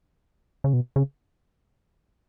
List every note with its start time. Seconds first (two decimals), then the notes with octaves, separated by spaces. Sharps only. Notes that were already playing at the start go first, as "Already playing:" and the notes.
0.64 C#3
0.73 B2
0.96 C#3